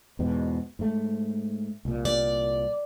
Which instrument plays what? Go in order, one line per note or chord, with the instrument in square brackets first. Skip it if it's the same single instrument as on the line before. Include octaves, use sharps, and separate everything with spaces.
[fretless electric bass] E2 G#2 B2
G#2 A3
C2 A#2
[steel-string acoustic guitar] D5